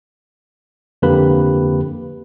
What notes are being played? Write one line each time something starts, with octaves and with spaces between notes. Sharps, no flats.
F2 D3 A#3 G4 B4 B5